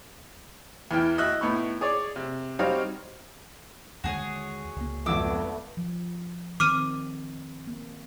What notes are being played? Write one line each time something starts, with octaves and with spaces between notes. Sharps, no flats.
E2 E3 E4 G5 F6
F#4 D#5 E5 F#6
A2 B3 D#4 E4 C#6
G#4 C#5 D5
C3
G3 C4 D#4 F#4 C#5 F5
D#2 D3 G#3 F#4 G#4 C#5
C#2 A#3
G#1 F2 A3 B3 D6 E6
F3
D#3 C4 D6 F6 D#7
A#3